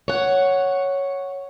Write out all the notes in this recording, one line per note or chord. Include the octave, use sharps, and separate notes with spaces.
C#5 F#5